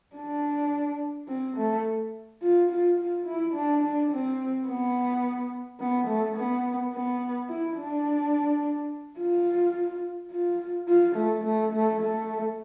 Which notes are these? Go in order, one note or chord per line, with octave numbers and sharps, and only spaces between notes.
D4
C4
A3
F4
F4
F4
E4
D4
D4
C4
B3
B3
A3
B3
B3
E4
D4
F4
F4
F4
A3
A3
A3
A3